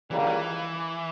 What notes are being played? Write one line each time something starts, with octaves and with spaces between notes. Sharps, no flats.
C#2 C#3 E3 G3 A#3
D3
E3